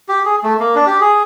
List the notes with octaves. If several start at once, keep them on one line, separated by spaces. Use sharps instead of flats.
G4
G#4
A3
A#3
D4
G4
G#4